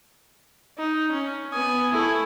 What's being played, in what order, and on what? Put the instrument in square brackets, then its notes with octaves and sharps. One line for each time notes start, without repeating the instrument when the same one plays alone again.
[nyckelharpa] D#4
C#4
[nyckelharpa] B3 G#5 [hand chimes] D#6
[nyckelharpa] A3 E4 [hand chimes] A4 C#6